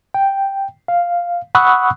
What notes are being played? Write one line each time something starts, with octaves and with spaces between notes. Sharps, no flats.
G5
F5
F#5 B5 C#6 D#6 E6 F#6